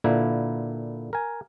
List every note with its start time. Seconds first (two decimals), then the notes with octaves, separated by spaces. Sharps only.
0.04 A#2 D3 A#3 E4 B4
1.13 A#4 G#5